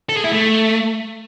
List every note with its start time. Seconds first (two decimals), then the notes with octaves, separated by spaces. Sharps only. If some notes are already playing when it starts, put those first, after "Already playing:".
0.09 A4
0.17 G#4
0.24 E4
0.32 A3